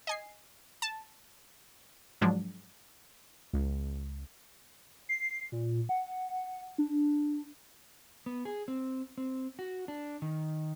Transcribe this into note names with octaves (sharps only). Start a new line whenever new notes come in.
D#5 G#5 C7
A5
G#2 F3 F#3 G#3 D4
C#2
C7
A#2
F#5
D4
B3
G#4
C4
C4
F#4
D4
D#3